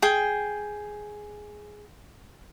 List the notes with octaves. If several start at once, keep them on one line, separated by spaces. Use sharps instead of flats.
G#4 G5